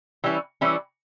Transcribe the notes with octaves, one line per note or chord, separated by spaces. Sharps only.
E3 G3 C#4 E4
E3 G3 C#4 E4